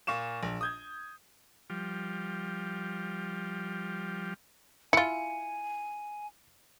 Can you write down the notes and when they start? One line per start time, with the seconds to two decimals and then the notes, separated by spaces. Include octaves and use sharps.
0.07 A#2 F5 C#6 E7
0.43 A#1
0.61 D#6 G6 G#6
1.70 F3 G3
4.93 E4 F4 G#5 C#7